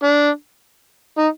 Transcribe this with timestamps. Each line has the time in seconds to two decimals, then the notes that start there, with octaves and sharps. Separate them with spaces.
0.03 D4
1.18 D#4